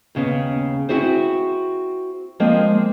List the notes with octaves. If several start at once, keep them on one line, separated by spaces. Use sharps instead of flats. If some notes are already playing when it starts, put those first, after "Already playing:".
D#2 C#3 B3
C4 D#4 E4 F#4 G#4 C5
F3 G#3 A#3 C4